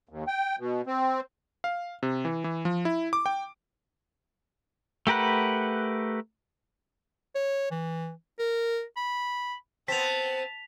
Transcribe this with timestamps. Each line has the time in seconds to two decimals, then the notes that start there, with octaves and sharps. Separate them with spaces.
0.09 D#2
0.27 G5
0.59 B2
0.87 C4
1.64 F5
2.03 C3
2.25 E3
2.44 E3
2.65 F3
2.85 E4
3.13 D6
3.26 G5
5.07 A3 G4 A#4 B4 F#5
7.35 C#5
7.71 E3
8.39 A#4
8.96 B5
9.88 B3 C4 A5 B6 F7